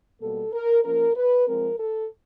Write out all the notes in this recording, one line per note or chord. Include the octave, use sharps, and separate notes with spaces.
B2 G3 A#3 A4
A#4
F3 A#3 C#4 A#4
B4
F3 G#3 C4 A#4
A4